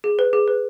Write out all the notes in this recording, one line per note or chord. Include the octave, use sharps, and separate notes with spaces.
G#4
B4
G#4
B4